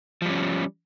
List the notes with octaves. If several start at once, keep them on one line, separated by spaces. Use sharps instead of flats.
F3 G3 C#4